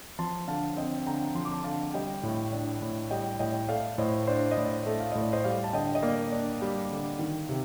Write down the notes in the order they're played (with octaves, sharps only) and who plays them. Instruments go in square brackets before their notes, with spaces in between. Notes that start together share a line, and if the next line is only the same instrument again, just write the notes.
[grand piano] F3 A5 C6
D3 F5 A5
C4 D#5 G5
D3 G5 A#5
F3 C6
D6
A5 C6
D3 F5 A5
G3 D#5 G5
A2
D4
A2
G3 D#5 G5
A2 D#5 G5
A3 D5 F5
A2 C5 D#5
D4 C5
D#5
A2 D5
A3
F5
A2 D#5
D5
C5 D#5
G3 D5 F5
A5
D3 D#5 G5
D#5
A#3 D5 F5
D4
G3
D3
D#3
C3